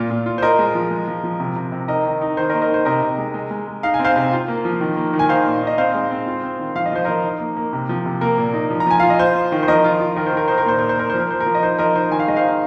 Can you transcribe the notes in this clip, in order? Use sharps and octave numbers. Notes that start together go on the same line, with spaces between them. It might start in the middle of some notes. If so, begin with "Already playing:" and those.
Already playing: A#2 F4
A#2
F4
C5
F4 A#4 D#5
G#3
F3
G#3
F3
F3
C3
C3
C3
D#4 A#4 D#5
D#3
D#4
D#3 C5
A#4 D#5
A#3
A#4 D#5
D#4 C5
C3 A#4 D#5
C3
G#3
G#3
G#3
G#3
D#4 F5
G#5
C4
C5 F5
C3
F4
A#3
F3
D#3
A#3
D#3
G#5
D#4 C5 F5
A#2
D#4
D#5
C4 C5 F5
G#3
C4
F4
C4
D#3
F3 F5
D#5
F3 C5
F3 A#4 D#5
D#4
A#3
A#3
C3
F3
C3
A#3 A#4
A#2
D#4
F3
A#5
F3 G#5
F4 F5
D#5
F4 C5
F4
D#3
C5
F3 A#4 D#5
F4
F4
D#3 A#4
C5
D#3 A#4
D#4 C5
A#4
A#2 C5
A#2 A#4
C5
A#3 A#4
F3 C5
A#4
F3 C5
A#4
F3
D#5
D#4 C5
F3 A#4 D#5
D#4 C5
D#3 G#5
F5
G#3 D#5
C5 F5
D#4